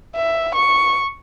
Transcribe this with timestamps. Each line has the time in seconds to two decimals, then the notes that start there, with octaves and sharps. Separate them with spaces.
0.15 E5
0.55 C#6